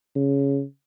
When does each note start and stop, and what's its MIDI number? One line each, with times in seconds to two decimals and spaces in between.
0.15 0.62 49